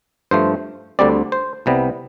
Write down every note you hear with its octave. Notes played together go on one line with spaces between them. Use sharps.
G2 F3 A3 C5
D2 D3 G3 C4 D5
C5
C2 C3 G3 B3